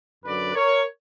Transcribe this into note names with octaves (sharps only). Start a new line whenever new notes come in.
F#2 D3 F#3 B4 D5
A#4 C#5